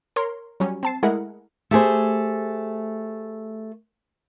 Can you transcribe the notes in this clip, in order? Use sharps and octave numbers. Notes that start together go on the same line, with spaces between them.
A#4 C#5 C6
F#3 G3 C#4
C4 A5 C7
G#3 A3 E4 G#4 A#4 F#5
A3 G4 G#4 C5